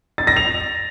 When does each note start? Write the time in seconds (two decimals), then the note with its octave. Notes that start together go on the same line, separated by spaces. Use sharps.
0.18 A6
0.27 A#6
0.36 F7